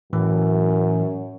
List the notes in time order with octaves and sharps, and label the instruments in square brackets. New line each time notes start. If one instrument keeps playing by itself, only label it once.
[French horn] F#2 [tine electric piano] A2 E3